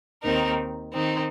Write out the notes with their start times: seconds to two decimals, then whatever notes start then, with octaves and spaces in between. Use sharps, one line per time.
0.24 D#2 D#3 C4 D#4 A#4
0.94 D#3 C4 D#4